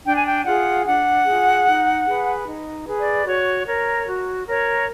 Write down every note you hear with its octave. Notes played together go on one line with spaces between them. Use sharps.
D4 G5
G#5
G5
F4 G#4 F#5
D4 F#5
F4 G#4
D#4
G#4 B4
D#4
G#4 B4
D5
F#4 C#5
A#4 C#5
F#4
A#4 C#5